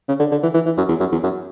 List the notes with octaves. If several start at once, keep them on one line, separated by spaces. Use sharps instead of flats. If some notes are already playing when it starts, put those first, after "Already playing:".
C#3
D3
D3
E3
E3
E3
F#2
E2
F#2
E2
F#2